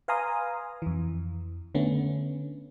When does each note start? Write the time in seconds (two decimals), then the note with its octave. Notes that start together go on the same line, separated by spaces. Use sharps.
0.08 B4 F5 G#5 A#5 C6 D#6
0.82 F2 E3
1.75 D3 A3 B3 C#4